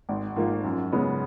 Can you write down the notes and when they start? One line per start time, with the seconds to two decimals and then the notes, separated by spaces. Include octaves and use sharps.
0.09 G#1
0.36 G#2 F3 A#3 F4
0.64 F#2
0.92 C#3 G#3 B3